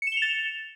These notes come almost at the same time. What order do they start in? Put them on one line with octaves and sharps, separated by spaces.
C#7 E7 G7 F7 A6